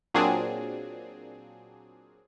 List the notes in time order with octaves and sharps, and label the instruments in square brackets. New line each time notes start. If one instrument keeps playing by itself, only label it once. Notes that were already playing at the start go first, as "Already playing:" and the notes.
[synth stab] A#2 F#3 A#3 C4 D4 G#4